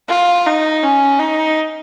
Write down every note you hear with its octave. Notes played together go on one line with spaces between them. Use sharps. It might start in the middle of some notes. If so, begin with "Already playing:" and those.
F4
D#4
C#4
D#4